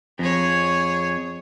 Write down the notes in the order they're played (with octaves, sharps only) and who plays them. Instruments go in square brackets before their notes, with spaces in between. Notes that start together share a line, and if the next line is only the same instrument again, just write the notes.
[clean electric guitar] F2 [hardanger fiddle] G#4 C#5